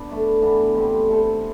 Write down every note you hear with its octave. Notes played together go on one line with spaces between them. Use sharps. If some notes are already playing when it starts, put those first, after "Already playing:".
Already playing: B3 D4
A3 E4 B4 D5
E3 B3 D4
D3 G3 C4
A3 E4 A4 C5